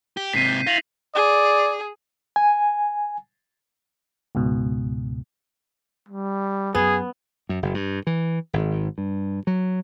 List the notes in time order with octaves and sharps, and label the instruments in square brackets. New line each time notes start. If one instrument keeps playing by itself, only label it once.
[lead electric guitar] G4
[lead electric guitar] G#2 C3 [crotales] B6 C7 D#7
[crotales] G6
[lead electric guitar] E4 F5 [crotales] A#6 F7 F#7
[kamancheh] G#4 [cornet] D5
[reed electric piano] G#5
[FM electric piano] C#2 G#2 B2
[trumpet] G3
[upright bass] F#2 [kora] B3 [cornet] G#4
[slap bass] F#2
F#1
G2
E3
G#1
G2
F#3